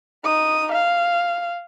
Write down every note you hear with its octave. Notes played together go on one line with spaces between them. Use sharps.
D#4 D#6
F5